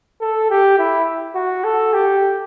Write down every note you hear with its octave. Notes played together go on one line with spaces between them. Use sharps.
A4
G4
E4
F#4
A4
G4